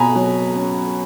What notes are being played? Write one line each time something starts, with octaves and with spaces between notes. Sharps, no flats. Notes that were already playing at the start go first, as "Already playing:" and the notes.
Already playing: B2 G#5 A#5 B5
F#3
C#4